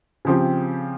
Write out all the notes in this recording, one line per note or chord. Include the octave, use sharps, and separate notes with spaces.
C#3 F3 C4 G4